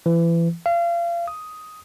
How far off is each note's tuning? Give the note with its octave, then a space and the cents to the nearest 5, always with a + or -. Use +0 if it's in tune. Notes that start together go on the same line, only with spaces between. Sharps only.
E3 +30
F5 -30
D#6 +5